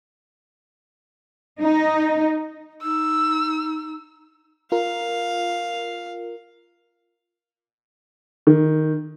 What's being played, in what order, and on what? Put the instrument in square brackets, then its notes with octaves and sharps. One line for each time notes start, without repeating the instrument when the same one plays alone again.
[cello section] D#4
[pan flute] D#4 [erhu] E6
[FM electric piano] F4 A#4 [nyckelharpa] F5
[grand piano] D#3